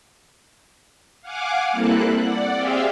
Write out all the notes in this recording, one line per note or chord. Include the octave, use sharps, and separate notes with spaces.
F5 F#5 G#5 D6
G3 A#3 C4 E4 A4 F#6
D5 F#5
C4 G4 G#4 E5 F5 G5